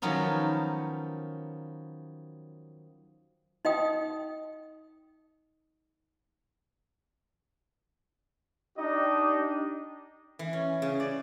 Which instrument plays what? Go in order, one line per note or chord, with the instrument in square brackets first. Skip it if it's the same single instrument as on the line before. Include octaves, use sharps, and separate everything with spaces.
[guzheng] D#3 F3 F#3 B3 C#4 D#4
[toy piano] D#4 D#5 G5 D#6
[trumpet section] D4 D#4 G4 D#5
[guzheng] E3
C#4
C#3
D5